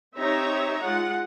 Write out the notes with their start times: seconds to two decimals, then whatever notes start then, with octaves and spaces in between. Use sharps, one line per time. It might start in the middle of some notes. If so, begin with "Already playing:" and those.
0.16 C4 D#4 G4 C#5 E5 A#5
0.83 G#3 F4 F#5